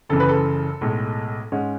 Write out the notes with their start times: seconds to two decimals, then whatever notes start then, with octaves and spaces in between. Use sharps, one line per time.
0.09 F#1 F#2 C#3 E3 A4
0.20 B4
0.29 A4
0.81 B1 A2 G#3
1.52 G#2 G#3 C#4